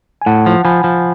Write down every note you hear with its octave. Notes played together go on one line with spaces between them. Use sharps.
G#5
A2 F#5 A5
F3
F3 G#5 B5
F3